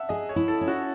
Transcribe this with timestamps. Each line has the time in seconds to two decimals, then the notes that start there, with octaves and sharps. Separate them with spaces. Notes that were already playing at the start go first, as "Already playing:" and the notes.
Already playing: E5 F#5 A5
0.09 G#4 D#5
0.29 C#5
0.36 E4
0.48 A4
0.61 C#4
0.68 F#4